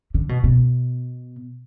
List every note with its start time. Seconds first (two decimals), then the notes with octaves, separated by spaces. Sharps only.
0.14 D3
0.29 B2
0.44 B2